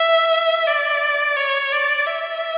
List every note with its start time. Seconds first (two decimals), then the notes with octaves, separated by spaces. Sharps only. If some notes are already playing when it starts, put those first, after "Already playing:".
Already playing: E5
0.67 D5
1.36 C#5
1.72 D5
2.06 E5